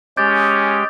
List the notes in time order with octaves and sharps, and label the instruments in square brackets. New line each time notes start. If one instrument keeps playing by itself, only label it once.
[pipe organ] G#3 G4 G5 [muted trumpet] C#4 [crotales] D6 D#6 [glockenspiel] G6 A6